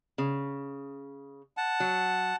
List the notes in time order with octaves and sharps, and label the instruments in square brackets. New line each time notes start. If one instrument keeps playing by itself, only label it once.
[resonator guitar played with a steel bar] C#3
[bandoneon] F#5 A5
[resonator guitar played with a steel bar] F#3